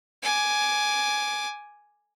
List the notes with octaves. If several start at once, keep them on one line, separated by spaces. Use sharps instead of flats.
G#5 D6